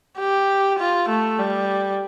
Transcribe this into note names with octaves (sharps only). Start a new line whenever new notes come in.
G4
F4
A3
G3